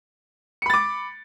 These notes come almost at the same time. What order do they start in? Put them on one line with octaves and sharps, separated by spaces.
C#7 B5 A6 D6